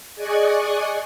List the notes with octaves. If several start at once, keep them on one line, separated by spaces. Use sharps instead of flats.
G#4 D5 D#5 G#5 C#6 F#6